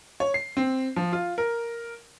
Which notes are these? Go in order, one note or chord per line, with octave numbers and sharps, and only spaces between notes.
C#5
C7
C4
F3
F4
A#4